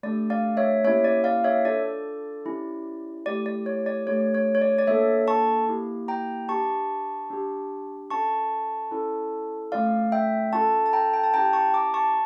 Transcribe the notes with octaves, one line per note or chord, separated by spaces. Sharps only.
A3 D4 G4 D5
D5 F5
C#5 E5
A#3 C#4 E4 G4 C#5 E5
D5
D5 F5
C#5 E5
D4 F4 A4 D5
C#4 E4 G4
A3 E4 G4 D5
D5
C#5
D5
A3 D4 G4 C#5
C#5
C#5
D5
D5
A#3 D4 F4 A4 C#5 E5
A5 C#6
A#3 E4 G4
G5 A#5
D4 G4 A5 C#6
D4 G4
C#4 F4 A4 A5 C#6
C#4 E4 A4
A3 C#4 F4 D5 F5
E5 G5
C#4 F4 A4 A5 C#6
A5
G5 A#5
G5
A5
C#4 E4 G4 G5 A#5
A5 C#6
A#5 D6
A5 C#6